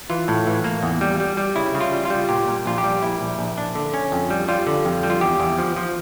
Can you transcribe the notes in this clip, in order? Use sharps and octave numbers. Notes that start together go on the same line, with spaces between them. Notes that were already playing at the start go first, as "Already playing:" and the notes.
E3 F4
A2
E3
A#3
E2
G3
G3
G3
C#3 E4
C#3
F4
G3
F4
G3
A#2 G4
A#2
A#1 F4
G4
G3
A#1 E4
A#1
A#1
D4
D3
C#4
F2
G3
G3 F4
D3
F2
G3
F4
E2 G4
E2
F3
F3